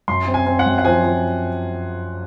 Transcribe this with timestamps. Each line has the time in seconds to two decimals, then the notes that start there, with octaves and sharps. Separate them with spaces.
0.08 F#2 C6
0.27 C4
0.34 G#5
0.46 C4
0.59 F#5
0.66 F#2
0.78 F#5
0.85 F3 G#5
1.04 F3